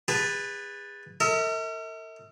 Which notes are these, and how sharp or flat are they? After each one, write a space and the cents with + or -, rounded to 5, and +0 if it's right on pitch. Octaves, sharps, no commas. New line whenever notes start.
G#4 -35 B4 +0 A5 +0
A#4 -45 E5 -40